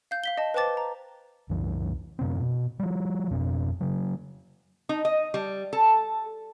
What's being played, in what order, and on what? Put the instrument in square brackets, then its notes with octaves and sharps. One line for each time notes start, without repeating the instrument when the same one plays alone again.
[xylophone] F5 G6
F5 B6 G7
D#5 A5
B4 C5 G5 A5 D6 A6
A#5
[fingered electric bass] C2 F#2 E3
F#2 C3 B3 C4
B2
F3 G3
F2 B2 C4
C#3 F#3
[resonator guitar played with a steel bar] D#4
D#5
G3
A4